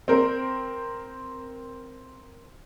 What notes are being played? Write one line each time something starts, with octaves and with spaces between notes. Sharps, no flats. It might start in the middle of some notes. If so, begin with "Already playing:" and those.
C4 A#4 C5